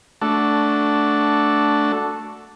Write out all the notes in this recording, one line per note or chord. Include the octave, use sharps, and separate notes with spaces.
A3 D4 F#4 A4